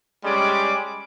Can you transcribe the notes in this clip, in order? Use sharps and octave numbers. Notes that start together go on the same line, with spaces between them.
G3 G#3 C#4 D6